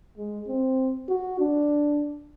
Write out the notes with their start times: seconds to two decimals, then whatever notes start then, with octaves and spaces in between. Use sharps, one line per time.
0.18 G#3
0.48 C4
1.08 F#4
1.40 D4